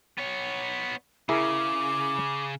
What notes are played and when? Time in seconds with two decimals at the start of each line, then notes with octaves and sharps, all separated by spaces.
0.18 B3 C#5
1.29 C#3 E4 G#4 A#4 D6